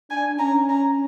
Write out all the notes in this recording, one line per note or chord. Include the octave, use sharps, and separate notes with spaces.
D4 G#5
C#4 A#5
A#5